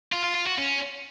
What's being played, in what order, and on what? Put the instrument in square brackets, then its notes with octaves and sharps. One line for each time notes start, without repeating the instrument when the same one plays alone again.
[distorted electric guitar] F4
F4
F4
F#4
C#4